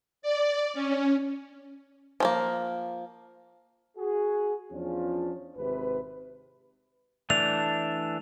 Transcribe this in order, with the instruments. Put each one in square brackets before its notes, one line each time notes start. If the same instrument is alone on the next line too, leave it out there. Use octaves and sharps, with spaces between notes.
[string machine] D5
C#4
[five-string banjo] F3 A3 A#3
[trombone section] F#4 G#4
E2 F3 C#4 D4 F4
G#1 C3 B4
[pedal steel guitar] E3 A3 D4 [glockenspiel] F7